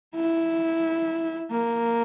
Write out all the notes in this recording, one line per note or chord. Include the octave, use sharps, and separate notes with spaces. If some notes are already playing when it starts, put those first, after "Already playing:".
E4
A#3